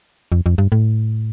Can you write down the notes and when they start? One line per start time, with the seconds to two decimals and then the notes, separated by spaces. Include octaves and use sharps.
0.32 F2
0.46 F2
0.58 G2
0.72 A2